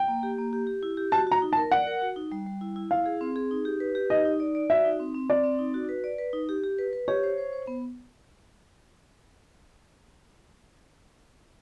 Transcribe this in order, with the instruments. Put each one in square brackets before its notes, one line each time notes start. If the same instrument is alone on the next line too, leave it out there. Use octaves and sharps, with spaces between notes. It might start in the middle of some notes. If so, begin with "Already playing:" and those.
Already playing: [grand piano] G5
[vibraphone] A#3
G4
A#3
G4
G4
E4
G4
[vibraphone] F#4 [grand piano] A5
[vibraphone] F#4 [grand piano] A#5
[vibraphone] D#4
[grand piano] A5
[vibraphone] A#4
[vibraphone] D5 [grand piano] F#5
[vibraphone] A#4
F#4
D#4
G3
G3
E4
E4
[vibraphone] E4 [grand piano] F5
[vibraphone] G#4
C4
G#4
D#4
G4
B4
G4
[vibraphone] D#4 [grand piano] D#5
[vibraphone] D#4
D5
D5
[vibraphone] F#4 [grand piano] E5
[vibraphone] D#4
C4
C4
[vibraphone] C4 [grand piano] D5
[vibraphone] C4
D#4
F#4
B4
D5
B4
D#4
G4
G4
B4
B4
[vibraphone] G4 [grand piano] C#5
[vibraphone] C5
C5
C5
B3